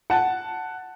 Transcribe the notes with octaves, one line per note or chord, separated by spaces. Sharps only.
F#5 A5